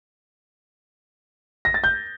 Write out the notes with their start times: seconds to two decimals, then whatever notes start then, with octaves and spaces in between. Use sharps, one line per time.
1.65 A#6
1.74 A6
1.84 G6